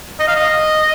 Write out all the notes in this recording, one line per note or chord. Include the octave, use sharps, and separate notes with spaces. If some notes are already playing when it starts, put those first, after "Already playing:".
D#5
F5
D#5